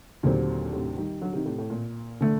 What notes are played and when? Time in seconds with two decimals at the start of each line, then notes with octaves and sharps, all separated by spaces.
0.23 D#2 A#2 D3 F#3 C4 G4
0.72 A2 C3
0.97 D#3 G3
1.21 D3 F#3
1.33 C3 D#3
1.46 A2 C3
1.58 A2
1.70 A#2
2.21 D3 A3